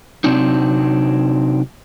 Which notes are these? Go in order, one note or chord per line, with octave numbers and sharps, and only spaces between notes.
C3 F3 F#3 C4 D4 D#4